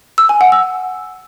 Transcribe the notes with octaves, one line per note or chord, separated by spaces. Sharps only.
E6
G#5
F#5
E6